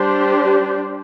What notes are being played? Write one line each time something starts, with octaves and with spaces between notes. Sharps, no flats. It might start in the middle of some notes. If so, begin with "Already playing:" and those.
Already playing: G3 D4 G4 C5